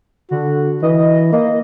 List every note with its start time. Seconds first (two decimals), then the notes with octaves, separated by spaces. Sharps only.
0.31 D3 F#4
0.82 E3 D#5
1.33 A#3 D#5